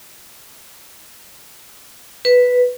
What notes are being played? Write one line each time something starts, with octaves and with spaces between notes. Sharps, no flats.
B4